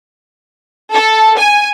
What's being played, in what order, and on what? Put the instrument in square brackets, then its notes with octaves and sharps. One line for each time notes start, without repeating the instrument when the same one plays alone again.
[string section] A4
G#5